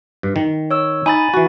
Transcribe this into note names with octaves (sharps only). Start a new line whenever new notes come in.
G2
D#3
C#5 E6
D#4 G#5 B5 A6
E3 F#4